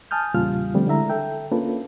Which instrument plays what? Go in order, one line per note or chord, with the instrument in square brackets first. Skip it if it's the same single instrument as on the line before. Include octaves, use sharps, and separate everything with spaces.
[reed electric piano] G#5 A5 D#6 F6 G6
E2 A#2 C#3 G3 F4 F6
D3 F3 G3 A3 C4
D3 G#3 E4 E5 A#5
A4 E5 G5
A#3 C#4 D4 F4 A4 B4